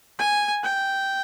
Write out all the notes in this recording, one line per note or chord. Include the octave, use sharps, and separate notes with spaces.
G#5
G5